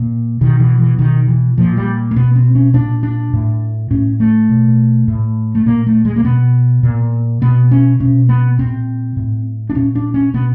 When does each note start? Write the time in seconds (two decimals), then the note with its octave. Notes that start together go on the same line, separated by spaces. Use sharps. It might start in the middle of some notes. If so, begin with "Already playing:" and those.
Already playing: A#2
0.41 B2 D#3
0.60 E3
0.79 E3
0.98 B2 D#3
1.28 E3
1.58 A#2 F3
1.77 G3
2.11 A#3
2.16 B2 B3
2.36 C4
2.55 C#4
2.74 A#2 D4
3.03 D4
3.33 A2
3.91 A2 C#4
4.20 A3
4.49 B2
5.08 A2
5.55 A3
5.66 A#2 A#3
5.87 A3
6.05 G#3
6.16 A#3
6.25 B2 B3
6.83 A#2
7.42 B2 B3
7.71 C#4
8.00 B2 C#4
8.29 B3
8.59 A#2 C4
9.17 A2
9.70 D4
9.75 A#2 C#4
9.95 D4
10.14 C#4
10.34 B2 B3